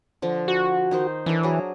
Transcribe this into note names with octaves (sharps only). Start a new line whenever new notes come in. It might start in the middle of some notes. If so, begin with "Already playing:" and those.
D3 F3
F#4
D#3 D#4 C5
E3 D4 A#4
F#3 G#4